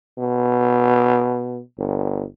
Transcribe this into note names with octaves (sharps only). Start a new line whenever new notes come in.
B2
G1